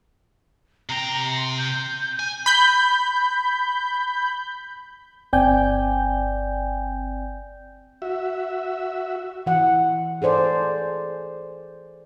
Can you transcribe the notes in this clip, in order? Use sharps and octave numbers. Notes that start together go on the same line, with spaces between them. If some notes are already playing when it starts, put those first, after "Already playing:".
C3 G5 A#5
C6
G6
G#5
B5 G6
G1 C4 D5 G5 G#5 G6
F#4 E5
E3 F#5
G#4 A4 C5 D5